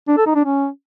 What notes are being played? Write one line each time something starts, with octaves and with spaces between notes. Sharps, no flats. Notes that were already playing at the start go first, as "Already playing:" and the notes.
D4
A4
D#4
D4
C#4